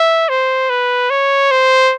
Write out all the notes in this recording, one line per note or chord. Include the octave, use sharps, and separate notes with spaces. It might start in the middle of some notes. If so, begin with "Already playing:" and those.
Already playing: E5
C5
B4
C#5
C5